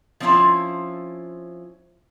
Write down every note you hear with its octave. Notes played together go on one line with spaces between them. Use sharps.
F3 C4 C#4 E4 F4 A5